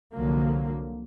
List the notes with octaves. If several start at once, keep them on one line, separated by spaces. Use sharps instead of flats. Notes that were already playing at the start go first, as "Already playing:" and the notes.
C2 D3 F3 F#3 A#3